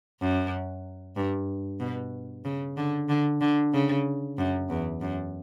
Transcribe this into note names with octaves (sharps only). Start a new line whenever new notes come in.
F#2
G2
B2
C#3
D3
D3
D3
C#3
F#2
E2
F#2